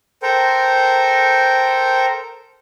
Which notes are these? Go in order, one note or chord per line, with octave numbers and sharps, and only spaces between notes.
A4 A#4 C5 G5